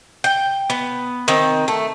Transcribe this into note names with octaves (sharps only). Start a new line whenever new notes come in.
G5
B3
D#3 C4
A3